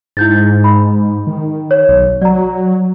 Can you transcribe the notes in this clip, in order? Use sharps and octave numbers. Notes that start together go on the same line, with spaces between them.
G#2 E4 G6 A6
B5
D#3
C#5
B1
F#3 D5 A#5